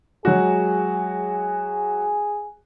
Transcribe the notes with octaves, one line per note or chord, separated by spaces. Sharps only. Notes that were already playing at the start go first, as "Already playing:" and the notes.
F#3 G#3 F#4 G#4